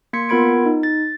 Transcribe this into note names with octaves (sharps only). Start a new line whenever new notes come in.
A#3 C6 G#6 B6 C#7
B3 F4 A#4 B5 G#6 D7
D#4
A6